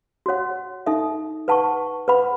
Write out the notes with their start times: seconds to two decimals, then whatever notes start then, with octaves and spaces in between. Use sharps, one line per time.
0.26 F#4 C#5 F#5
0.86 D#4 A4 E5
1.48 B4 F#5 A5 C#6
2.08 B4 F#5 B5